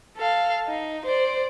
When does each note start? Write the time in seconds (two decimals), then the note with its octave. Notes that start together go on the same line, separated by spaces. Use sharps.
0.17 A4 F5
0.68 D#4
1.06 C5 D5